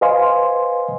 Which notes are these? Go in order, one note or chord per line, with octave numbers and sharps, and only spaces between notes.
B4 C5 D#5 F5 G#5 C6